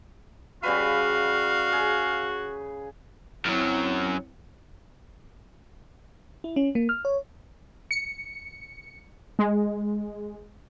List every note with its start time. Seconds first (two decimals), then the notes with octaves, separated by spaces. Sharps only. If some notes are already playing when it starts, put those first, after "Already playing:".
0.63 C#3 G3 F#4 B4 F5
1.73 G#4
3.45 F#2 F#3 C4 E4
6.44 E4
6.56 C#4
6.75 A#3
6.89 F6
7.05 C#5
7.91 C#7
9.39 G#3